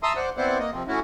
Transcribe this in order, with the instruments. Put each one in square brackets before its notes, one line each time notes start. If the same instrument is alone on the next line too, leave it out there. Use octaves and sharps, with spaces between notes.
[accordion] E5 A5 A#5 C6 D#6 E6
C5 D5 F#5
B3 C4 E4 C5 D5 F#5
A#3 D#5
C3 F3 C4
A3 C#4 E4 F#4